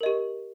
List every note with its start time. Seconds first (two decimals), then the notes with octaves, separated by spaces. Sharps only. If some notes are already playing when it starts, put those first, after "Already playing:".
0.01 A#4
0.03 D#5
0.06 G4